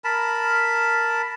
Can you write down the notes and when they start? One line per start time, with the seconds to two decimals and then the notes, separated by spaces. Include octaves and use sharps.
0.04 A#4 A5 B5